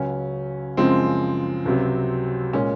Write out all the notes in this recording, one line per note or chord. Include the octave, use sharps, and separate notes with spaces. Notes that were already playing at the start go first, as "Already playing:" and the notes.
Already playing: C#2 C#3 F#3 C#4
F#2 C#3 F3 G#3 C4
C#2 C3 F#3
A#2 G#3 C#4